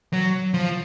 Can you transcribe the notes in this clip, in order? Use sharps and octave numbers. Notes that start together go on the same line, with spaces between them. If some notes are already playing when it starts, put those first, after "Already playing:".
F#3
F3